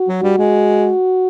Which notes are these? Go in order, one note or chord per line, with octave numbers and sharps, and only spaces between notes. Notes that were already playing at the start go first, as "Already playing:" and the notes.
Already playing: F#4
F#3
G3
G#3